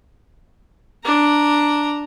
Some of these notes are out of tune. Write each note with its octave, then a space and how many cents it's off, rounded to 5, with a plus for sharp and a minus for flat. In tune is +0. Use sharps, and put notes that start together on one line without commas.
D4 +0 A#5 +0